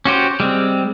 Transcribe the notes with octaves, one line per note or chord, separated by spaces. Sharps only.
C#4 F#4 G4 C5
G3 G#3 C4